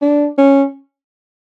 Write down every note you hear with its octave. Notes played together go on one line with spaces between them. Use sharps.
D4
C#4